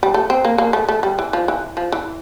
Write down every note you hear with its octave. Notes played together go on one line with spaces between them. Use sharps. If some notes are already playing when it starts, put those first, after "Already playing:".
G3
A3
C4
A#3
A#3
A3
A3
G3
E3
F3
E3
F3
E3